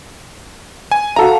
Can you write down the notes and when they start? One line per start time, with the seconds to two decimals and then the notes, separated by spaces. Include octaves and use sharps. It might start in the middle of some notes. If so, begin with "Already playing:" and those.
0.91 G#5
1.16 F#4 A4 F5 A#5